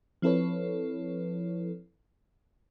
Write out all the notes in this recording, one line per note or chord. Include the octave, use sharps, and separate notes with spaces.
F3 C4 E4 A4 B4 C#5